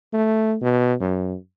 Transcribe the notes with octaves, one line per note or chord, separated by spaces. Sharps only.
A3
B2
F#2